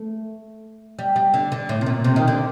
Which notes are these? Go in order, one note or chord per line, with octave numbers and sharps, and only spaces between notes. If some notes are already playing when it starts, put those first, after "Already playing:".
Already playing: A3
G3
G3
D3
D3
A2
C3
A#2
C3
D#3
D3